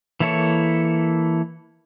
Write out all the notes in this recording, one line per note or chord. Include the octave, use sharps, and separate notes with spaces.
E3 A#3 E4 A4 C#5